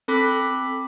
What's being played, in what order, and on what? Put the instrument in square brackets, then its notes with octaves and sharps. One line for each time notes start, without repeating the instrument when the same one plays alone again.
[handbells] C4 A4 B5 D6 F#6 B6